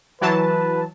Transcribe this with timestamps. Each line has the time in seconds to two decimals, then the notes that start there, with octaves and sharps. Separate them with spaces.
0.21 E3 F#3 B4 A5